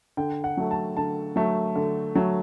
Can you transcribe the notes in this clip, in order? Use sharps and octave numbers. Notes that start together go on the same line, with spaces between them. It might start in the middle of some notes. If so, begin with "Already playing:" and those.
D3 G5
F#5
F#3 A3
A5
D3 A5
F#3 A3
D3
F#3 A3